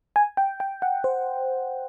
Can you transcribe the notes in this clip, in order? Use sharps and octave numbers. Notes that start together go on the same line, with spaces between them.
G#5
G5
G5
F#5
C5